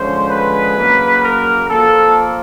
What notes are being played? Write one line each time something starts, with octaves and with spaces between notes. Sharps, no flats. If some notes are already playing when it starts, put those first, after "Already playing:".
Already playing: D3 F3 G#3 C#4 C5
B4
C#3 F#3 A#3
A#4
A#2 F3 A#3 A4